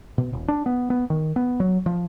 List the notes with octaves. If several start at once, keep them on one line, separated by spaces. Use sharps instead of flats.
B2
D#1
D4
B3
B3
D#3
B3
F#3
F3